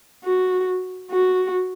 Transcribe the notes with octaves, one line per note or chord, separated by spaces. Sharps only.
F#4
F#4